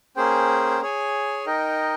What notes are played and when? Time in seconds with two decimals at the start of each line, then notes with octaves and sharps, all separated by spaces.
0.16 A#3 C#4 G#4 C5 G5
0.82 G#4 C#5 G#5
1.46 D#4 A#4 D#5 G5